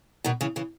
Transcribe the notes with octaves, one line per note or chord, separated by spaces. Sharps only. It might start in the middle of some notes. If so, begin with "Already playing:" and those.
B2 D#3
C#3 E3
C#3 E3